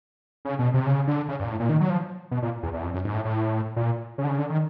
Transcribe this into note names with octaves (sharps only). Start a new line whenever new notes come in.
C#3
B2
C3
C#3
D3
C#3
G2
A#2
A2
A#2
D#3
F#3
F3
B2
A#2
E2
E2
F2
F#2
G#2
A2
A2
A#2
C#3
D3
C#3
D3
D#3